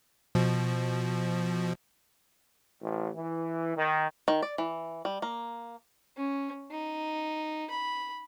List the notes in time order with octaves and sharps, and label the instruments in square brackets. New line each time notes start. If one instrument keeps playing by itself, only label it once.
[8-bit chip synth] B2 F3
[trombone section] A1
E3
D#3
[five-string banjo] D#3
D5
E3
G3
A#3
[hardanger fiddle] C#4
D#4
B5